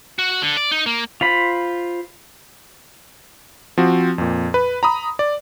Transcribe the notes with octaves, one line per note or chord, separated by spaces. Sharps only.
F#4
D3
D5
D#4
A#3
F4 C5 B5
F3 C4 F#4
F2 A#2
B4
A#5 B5 D#6
D5